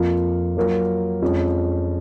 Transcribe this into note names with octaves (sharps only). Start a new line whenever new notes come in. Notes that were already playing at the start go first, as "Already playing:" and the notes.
Already playing: F2 F3 A#3 F4
F#3 A#3 F4 A#4
F2 F3 G#3 C#4